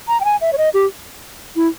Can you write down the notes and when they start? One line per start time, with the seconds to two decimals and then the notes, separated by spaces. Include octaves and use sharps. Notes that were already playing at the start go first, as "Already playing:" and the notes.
0.08 A#5
0.21 G5
0.25 G#5
0.41 E5
0.53 C#5
0.58 D#5
0.74 G4
1.56 E4